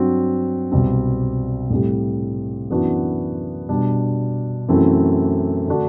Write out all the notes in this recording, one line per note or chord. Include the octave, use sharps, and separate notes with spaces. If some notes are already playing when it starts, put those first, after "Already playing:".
Already playing: G2 F#3 C4 F#4
C2 B2 G3 C4
A2 G3 C4 G4
F#2 E3 B3 D4 F#4
B2 G3 D4
F#2 E3 A3 C4 F#4
D3 A3 D4 F#4